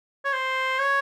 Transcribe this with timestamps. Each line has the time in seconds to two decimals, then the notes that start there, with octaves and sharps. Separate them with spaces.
0.25 C#5
0.33 C5
0.79 C#5